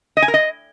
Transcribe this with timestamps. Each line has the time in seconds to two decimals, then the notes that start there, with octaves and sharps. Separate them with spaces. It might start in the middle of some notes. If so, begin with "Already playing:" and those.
0.17 D#5
0.22 G#5
0.28 A#4
0.34 D#5